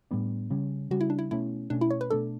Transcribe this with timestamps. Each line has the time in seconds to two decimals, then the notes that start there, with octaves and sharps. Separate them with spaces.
0.11 A2 G3 B3 D4
0.50 C#3 G3 C#4
0.91 C#3 G3 C#4 F#4
1.01 E4
1.10 D4
1.19 E4
1.31 B2 A3 C#4 E4
1.70 B2 A3 C#4 D4
1.81 E4
1.90 C#5
2.01 B4
2.10 B2 A3 D4 A4